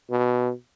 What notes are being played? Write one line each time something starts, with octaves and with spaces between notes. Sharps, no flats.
B2